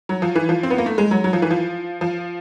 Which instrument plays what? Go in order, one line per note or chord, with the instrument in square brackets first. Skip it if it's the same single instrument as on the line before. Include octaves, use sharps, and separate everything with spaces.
[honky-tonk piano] F#3
F3
E3
F3
C4
B3
A#3
A3
G#3
F#3
F#3
F3
E3
F3
F3